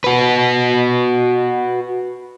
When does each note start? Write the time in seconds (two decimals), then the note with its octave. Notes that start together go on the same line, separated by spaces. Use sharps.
0.04 F#4 B4